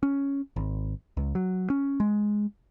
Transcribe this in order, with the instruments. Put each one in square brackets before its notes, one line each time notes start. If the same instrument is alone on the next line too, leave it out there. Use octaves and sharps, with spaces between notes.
[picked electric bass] C#4
G#1
C#2
F#3
C#4
G#3